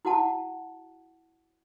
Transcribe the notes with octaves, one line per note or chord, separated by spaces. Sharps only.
E4 F#4 F#5 A5